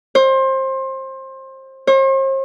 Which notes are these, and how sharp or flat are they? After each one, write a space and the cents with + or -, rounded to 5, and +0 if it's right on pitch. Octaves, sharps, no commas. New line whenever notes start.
C5 +25
C5 +45